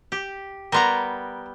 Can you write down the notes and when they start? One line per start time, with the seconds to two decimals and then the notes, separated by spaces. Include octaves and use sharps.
0.12 G4
0.72 G3 B3 A#4 A#5 C6